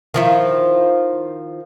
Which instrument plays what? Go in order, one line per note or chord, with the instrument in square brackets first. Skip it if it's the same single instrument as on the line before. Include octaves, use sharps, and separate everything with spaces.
[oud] D#3 F3 E4